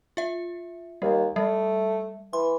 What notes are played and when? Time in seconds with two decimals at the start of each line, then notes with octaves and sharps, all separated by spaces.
0.17 F4 E5
1.02 D#2 G3
1.36 G3 A3
2.33 E3 C6